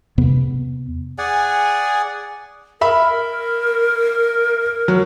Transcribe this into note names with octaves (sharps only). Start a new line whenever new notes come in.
E2 C3 B3
G#4 D5 F#5 G#5
A#4 E5 B5
F#3